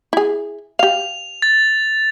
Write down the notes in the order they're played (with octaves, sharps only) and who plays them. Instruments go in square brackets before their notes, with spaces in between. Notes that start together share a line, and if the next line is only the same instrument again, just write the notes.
[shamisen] E4 G#4
[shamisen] G4 F5 [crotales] F7
[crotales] A6